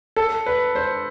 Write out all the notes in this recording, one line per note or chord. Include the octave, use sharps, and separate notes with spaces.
A4
B4
C5